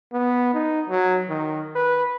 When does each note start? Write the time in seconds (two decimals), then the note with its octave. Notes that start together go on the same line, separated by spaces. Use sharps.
0.13 B3
0.54 D#4
0.89 F#3
1.29 D#3
1.75 B4